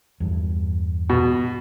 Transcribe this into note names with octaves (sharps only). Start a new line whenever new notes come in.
E2 G2
B2